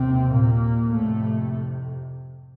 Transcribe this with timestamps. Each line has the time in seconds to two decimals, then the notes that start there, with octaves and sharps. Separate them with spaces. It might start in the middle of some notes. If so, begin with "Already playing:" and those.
Already playing: D#2 C3 C4
0.30 A#2 A#3
0.93 F2 A2 C3 A3